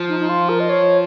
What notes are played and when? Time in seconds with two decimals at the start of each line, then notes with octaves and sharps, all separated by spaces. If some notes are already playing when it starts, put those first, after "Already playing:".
Already playing: F3
0.09 D#4
0.20 D#4
0.29 F4
0.49 A#4
0.60 D#5
0.69 C#5